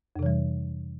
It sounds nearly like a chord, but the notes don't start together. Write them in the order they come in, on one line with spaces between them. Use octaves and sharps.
F2 C3 E3 G3